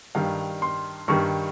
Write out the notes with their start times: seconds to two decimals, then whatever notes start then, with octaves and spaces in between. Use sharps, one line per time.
0.15 G2 D#3 G3 F5
0.62 C6
1.08 G2 D#3 G3 C#6